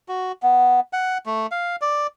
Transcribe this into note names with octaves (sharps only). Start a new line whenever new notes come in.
F#4
B3
F#5
A3
F5
D5